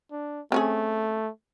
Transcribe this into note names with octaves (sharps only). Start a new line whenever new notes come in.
D4
A3 C4 C#4 G#4